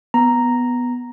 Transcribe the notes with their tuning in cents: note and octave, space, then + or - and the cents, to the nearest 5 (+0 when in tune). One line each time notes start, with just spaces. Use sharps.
B3 +0 A#5 +0